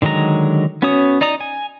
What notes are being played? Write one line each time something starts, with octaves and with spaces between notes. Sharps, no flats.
D3 D#3 F#3 G#3 A#5
B3 C#4 F#4 C#5 D#6
D#4 D5 A#5 D#6
G#5